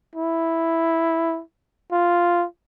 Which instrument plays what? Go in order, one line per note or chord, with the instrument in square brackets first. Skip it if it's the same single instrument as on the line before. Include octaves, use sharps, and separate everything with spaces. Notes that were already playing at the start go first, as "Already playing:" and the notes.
[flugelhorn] E4
F4